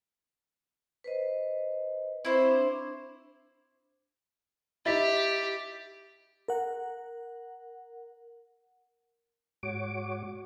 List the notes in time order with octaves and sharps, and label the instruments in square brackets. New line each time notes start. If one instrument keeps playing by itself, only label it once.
[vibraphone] B4 C5 D#5
[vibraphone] C4 B5 C#6 [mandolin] E4 C5
[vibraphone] D4
[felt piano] D#4 E4 [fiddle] G4 [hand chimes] A6 B6
[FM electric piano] A#4 F#5
[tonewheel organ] G#2 F#4 C#5 D6